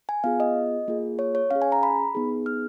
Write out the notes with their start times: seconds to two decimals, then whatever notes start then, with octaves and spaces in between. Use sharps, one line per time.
0.09 G#5
0.24 B3 F4 G#4 F5
0.40 D#5
0.88 A#3 F4 G#4
1.19 C#5
1.35 C#5
1.51 C#4 G#4 F5
1.62 G#5
1.72 A#5
1.83 B5
2.15 B3 D#4 G#4
2.46 F6